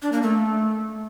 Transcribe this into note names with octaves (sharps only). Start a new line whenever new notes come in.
D4
A#3
A3